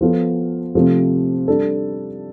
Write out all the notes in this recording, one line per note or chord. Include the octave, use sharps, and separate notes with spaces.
F3 B3 F4 A4
C3 F3 A3 C4
G3 D4 A4